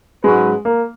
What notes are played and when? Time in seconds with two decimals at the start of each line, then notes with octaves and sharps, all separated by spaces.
0.24 G#2 F#3 G#3 C#4 F#4 B4
0.65 A#3